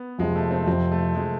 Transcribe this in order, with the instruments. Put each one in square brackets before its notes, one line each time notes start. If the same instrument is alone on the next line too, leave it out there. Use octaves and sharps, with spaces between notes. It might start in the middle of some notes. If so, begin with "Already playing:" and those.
Already playing: [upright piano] B3
[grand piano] F2 C3 F3 [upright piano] G#3
[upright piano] A3
C4
[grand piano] F2 C3 F3 [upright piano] C4
[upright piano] A3
[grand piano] C3 F3 [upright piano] G#3